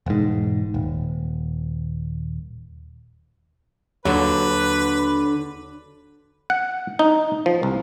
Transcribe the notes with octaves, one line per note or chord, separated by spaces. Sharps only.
E1 G#2
D#1
D#2 D3 F#3 B4
F#5
D#4
F3
C2